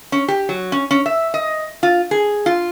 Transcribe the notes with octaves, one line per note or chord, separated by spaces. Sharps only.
C#4
G4
F#3
C#4
C#4
E5
D#5
F4
G#4
F4